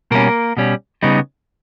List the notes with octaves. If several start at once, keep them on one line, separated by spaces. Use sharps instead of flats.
B2 G3 A#3 C#4 A#4
B2 G3 C#4
C#3 G3 B3 D#4